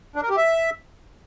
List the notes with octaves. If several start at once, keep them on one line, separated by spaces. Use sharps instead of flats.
D4
A#4
G4
E5